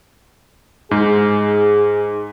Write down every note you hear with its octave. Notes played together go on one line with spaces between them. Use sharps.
G#2 G#4